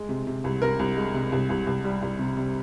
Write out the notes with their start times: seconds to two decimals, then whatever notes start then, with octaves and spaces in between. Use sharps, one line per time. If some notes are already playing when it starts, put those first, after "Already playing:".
Already playing: G#3
0.09 C3
0.27 C3
0.44 C2
0.62 C3 A#4
0.79 C2
0.97 G#3
1.14 C3
1.32 C2
1.49 C2
1.67 C2
1.84 G3
2.02 C2
2.19 C3
2.37 C3